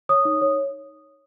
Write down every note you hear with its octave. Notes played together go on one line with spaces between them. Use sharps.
C#5 D#6
D#4
C#5